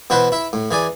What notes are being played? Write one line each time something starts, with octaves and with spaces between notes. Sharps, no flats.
B2 E3 E4 F#4 B4 C5
E4 E5
A2
E3 G#4 D5 G#5